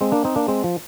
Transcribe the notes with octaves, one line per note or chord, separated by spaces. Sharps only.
G#3 C4
A#3 D4
C4 D#4
A#3 D4
G#3 C4
F3